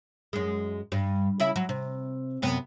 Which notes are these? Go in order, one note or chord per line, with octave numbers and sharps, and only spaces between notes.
F#2 G#3
G2
C#3 E4 E5
F#3
C3
F#2 C3 B3